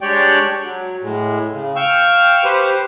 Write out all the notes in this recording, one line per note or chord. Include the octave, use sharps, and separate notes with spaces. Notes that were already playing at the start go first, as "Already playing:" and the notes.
G#3 D4 G4 C#5 D5 G5
F#3
A2 G#3
C#3
F5 G5 C#6 E6 F6
G4 B4 C5